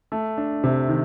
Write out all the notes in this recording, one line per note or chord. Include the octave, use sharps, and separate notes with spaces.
A3
D4
C3
D#3